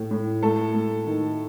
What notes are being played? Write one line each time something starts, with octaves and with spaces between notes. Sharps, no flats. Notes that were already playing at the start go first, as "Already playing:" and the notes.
Already playing: A2
A2
A3 A4
A3
D#3